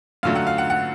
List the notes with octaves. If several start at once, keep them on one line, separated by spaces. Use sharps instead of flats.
F#2 D3 F#3 A3 F5
F#5
F5
F#5
F#5